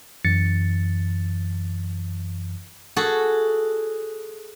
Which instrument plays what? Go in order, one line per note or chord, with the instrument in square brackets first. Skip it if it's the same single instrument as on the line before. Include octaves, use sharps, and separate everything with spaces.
[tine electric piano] F#2 E3 A6 C#7
[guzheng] F#4 G#4 A4